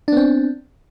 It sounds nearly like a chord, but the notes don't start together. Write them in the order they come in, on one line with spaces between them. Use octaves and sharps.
D4 B3 C4